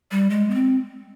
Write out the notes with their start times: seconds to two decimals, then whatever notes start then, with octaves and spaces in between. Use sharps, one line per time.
0.11 G3
0.30 G#3
0.50 B3
0.54 C4